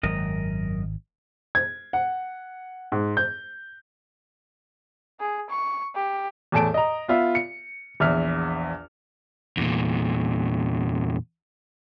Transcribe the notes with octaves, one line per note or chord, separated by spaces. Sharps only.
G#1 F#2 A#4 D#5
G#6
F#5
G#2
G6
G#4
C#6
G4
E2 A2 G#5 A5 D7
D#5 A#5
B3 F4 E5
C#7
A#1 E2 E5 F6
E2 A#2